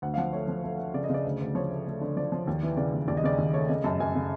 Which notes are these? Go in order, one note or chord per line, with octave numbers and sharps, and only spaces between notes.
D2 F#5
F5
F3 F#5
A3 C#5
F3
A3
A3
C#3 D5
D#5
C#3 D5
D2
D2
F3 C#5
A3
A3
D3
F3 D5
F3
D#2
E3
C#3 D5
D#2
D#2 D5
D#5
C#3 D5
D#2
A3 C#5
C#3 D#5
F#2 A5
F#2 G#5
C#3